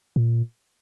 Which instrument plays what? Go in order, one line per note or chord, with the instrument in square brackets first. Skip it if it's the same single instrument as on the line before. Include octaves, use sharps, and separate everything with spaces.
[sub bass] A#2